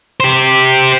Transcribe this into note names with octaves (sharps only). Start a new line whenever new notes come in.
G4 C5